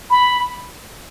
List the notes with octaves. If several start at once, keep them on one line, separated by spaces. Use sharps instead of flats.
B5